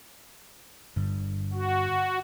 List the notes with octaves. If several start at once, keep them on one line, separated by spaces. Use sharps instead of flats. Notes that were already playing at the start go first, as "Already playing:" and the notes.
G2 D3
F#4